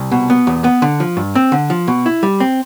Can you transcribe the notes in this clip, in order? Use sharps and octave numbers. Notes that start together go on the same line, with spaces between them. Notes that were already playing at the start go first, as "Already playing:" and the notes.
Already playing: C2
B2
B3
E2
B3
D3
F3
G2
C4
D3
F3
B2
E4
G3
C4